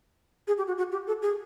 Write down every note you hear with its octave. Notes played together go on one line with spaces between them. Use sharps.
G#4
G4
F#4
F#4
G4
A4
G#4